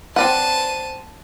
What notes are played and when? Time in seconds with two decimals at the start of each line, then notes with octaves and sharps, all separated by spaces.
0.16 C4 D5 F#5 A5 D#7